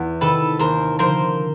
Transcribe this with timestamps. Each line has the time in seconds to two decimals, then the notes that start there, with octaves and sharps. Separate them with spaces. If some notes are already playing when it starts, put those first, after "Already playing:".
Already playing: E2
0.21 C3 D#3 A4 B4
0.59 D#2 A#4 C5
0.99 D3 F3 A#4 C5